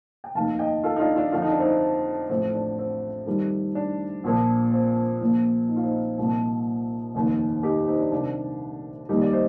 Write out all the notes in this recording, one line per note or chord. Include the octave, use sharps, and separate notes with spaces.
G5
F1 D#2 D#3 F5 A5
D#5 G5
F4 A4
D#4
D4 F4
D4 F4
F2 D3 F3 F4
D#4
D4
C4 D#4
A1 A2 F3 C4
D4
C4
F2 D#3 G3
D4
A#1 A#2 F3
C4
A#1 A#2 F3
D#4
F4
C4 D#4
C2 A#2 F3
F1 D#2 D#3
D#4 G4
C4 D#4
D4
C2 C3 D#3 D4
F1 D#2 D#3 G3 D#4 G4
D5
C5 D#5